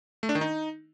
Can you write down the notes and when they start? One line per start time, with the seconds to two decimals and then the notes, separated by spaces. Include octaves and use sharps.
0.23 A3
0.29 D4
0.35 D#3
0.41 D#4